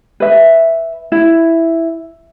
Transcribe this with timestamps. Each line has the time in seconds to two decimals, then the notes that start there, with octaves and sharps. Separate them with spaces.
0.20 B4 E5
1.12 E4